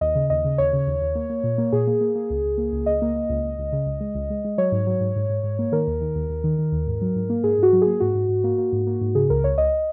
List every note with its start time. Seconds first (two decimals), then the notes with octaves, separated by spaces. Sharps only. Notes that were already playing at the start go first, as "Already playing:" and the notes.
0.01 D#2 D#5
0.15 C#3
0.30 D#2 D#5
0.45 C#3
0.58 D#2 C#5
0.73 C#3
0.87 D#2
1.01 D#2
1.15 A#3
1.30 A#3
1.44 A#2
1.58 A#3
1.73 A#2 G#4
1.87 A#3
2.01 A#3
2.15 A#3
2.30 C#2
2.44 C#2
2.58 A#3
2.72 C#2
2.86 C#2 D#5
3.02 A#3
3.15 A#3
3.29 C#2
3.44 C#2
3.58 C#2
3.72 C#3
3.86 C#2
4.01 G#3
4.15 C#2
4.30 G#3
4.45 G#3
4.58 F#3 C#5
4.72 G#2
4.87 F#3
5.01 G#2
5.16 G#2
5.29 G#2
5.43 G#2
5.59 A#3
5.72 D#3 A#4
5.87 D#2
6.01 D#3
6.15 D#2
6.29 D#2
6.44 D#3
6.58 D#3
6.72 D#2
6.87 G#2
7.01 F#3
7.16 G#2
7.30 A#3
7.44 G#2 G#4
7.58 G#2 F#4
7.73 F#3
7.82 A#3 G#4
8.00 G#2 F#4
8.15 G#2
8.29 G#2
8.44 A#3
8.58 A#3
8.72 G#2
8.87 A#3
9.01 G#2
9.15 C#3 G#4
9.30 C#2 A#4
9.44 C#2 C#5
9.58 C#2 D#5